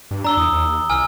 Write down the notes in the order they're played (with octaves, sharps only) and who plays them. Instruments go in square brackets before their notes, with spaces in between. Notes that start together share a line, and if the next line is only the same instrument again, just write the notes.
[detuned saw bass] G2
[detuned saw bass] D4 [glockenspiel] A#5 E6 G7
[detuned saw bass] E2 [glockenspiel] D#6
[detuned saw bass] D#2
[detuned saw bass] C2 [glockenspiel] G#5 E6 F6